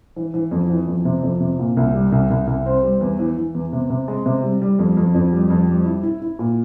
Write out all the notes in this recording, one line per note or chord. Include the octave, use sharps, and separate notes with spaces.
E3
E3
F2
E3
F2
C3
F2
C3
A#2
C2
G3
C2
C2
C2
C4
G3
E2
E3
E3
E2
C3
C3
G#3
C3
G3
G3
F2
F2
F2
G3
F2
G3
E4
E4
E4
A#2